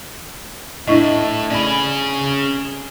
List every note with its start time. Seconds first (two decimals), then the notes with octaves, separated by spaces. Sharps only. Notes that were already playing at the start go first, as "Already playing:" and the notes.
0.88 A2 D4 E4 D#5
1.50 C#4 G#4 D5 B5